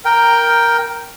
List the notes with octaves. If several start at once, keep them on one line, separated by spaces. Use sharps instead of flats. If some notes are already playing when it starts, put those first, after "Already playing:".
A#4 G5